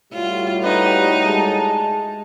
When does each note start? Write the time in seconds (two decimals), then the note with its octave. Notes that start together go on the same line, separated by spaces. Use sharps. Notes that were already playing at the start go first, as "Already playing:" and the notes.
0.13 A2 G3 F4 F#4
0.63 D#4 B4
1.26 G#3 A5